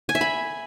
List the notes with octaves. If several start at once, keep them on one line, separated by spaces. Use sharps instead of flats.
G#5
E5
B5